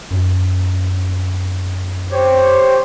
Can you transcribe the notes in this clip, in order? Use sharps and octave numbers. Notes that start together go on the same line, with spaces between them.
F#2
G4 C5 C#5